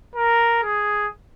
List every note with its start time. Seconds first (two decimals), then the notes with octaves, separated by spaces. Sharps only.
0.16 A#4
0.64 G#4